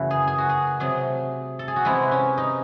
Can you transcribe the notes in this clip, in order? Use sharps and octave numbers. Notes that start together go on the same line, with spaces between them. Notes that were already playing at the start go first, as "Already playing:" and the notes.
Already playing: F#2 C#3 E3 A3 E4 F#4
G#4
G#4
F#4
G#4
C3 F#3 A3 G#4
A4
G#4
F#4
C3 E3 G#3 E4
C#4
D#4